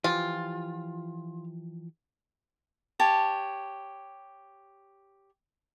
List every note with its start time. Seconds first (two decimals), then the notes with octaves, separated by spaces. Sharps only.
0.04 E3 F3 F4 G4
3.00 G4 C#5 A5